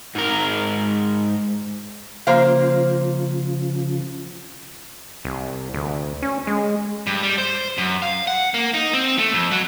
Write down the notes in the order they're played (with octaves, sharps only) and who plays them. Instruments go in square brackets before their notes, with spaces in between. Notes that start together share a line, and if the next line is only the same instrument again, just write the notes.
[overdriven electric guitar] G#2 A#4
[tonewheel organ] C#3 F3 [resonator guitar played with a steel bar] A#3 C5 F5
[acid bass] C2
D2
C#4
G#3
[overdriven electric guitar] G2
G3
C5
F#2
F5
F#5
A#3
D#4
C4
A3
F2
F#3